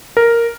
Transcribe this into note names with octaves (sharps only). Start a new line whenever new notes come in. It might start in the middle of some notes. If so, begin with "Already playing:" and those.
A#4